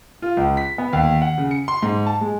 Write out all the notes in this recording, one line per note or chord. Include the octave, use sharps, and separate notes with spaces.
F4
C#2
B6
B3
D#2
F#5
C#3
C#7
C6
G#2
A5
G#3